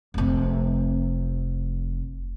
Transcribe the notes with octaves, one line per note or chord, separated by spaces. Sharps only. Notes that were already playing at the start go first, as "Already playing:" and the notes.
F1 C3